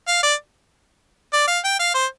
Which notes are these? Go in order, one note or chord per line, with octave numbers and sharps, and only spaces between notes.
F5
D5
D5
F5
G5
F5
C5